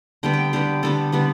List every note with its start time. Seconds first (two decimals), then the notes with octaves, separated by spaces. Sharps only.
0.23 D3 G3 B3 G5
0.33 G5
0.53 D3 G3 B3 G4
0.83 D3 G3 B3 A4
1.12 D3 G3 B3